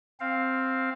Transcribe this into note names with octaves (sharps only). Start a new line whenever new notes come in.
C4 F5